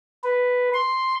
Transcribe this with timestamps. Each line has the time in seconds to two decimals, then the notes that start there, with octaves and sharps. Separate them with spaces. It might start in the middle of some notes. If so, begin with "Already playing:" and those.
0.24 B4
0.74 C6